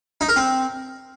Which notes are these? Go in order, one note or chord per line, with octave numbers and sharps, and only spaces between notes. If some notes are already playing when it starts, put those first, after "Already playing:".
D#4
A#4
C4